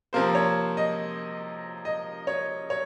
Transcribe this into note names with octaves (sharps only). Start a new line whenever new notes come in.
C3 F3 A#3 C5
C#5
D#5
D#5
C#5
C#5